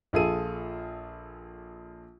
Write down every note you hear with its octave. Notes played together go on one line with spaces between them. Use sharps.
A#1 F4 G#4 A4 D#7